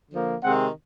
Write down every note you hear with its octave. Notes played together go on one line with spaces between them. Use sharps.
D3 F3 A#3
C3 D#3 G#3 C4 F#5